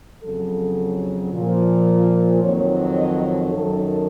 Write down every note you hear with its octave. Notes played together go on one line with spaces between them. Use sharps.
F2 C#3 F#3 A4
A#2 F3
F2 D#3 F#3 C#5
D#5
F#2 D#3 F#3 A4